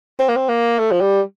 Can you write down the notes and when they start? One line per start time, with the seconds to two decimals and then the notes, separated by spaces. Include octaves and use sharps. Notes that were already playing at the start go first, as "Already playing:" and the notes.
0.20 C4
0.29 A#3
0.36 C4
0.49 A#3
0.79 A3
0.91 F3
1.01 G3